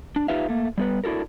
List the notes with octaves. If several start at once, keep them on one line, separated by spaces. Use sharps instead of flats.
D4
D#4 F4 G4 B4 E5 F5
A3 A#3
G3 B3 B4
D4 E4 F#4 A4 A#4